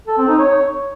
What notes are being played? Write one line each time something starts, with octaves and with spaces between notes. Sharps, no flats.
A4
C4
D#4
C#5